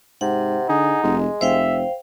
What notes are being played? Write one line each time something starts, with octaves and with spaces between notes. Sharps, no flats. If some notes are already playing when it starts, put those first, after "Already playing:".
G#2 C3 F#5
D3 D#4 G#4
F1 G#3
F1 C5 E5 F5 G5